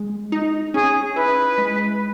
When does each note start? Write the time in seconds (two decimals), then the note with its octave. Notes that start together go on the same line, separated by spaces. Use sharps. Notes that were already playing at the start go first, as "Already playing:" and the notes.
Already playing: G#3
0.32 D#4
0.74 C#4 G#4
1.16 E4 B4
1.58 G#3